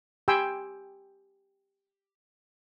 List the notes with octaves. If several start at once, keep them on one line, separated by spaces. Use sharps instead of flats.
G4 G5 G#5 B5 C6 E6